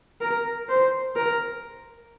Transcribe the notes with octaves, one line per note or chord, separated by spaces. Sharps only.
A#4
C5
A#4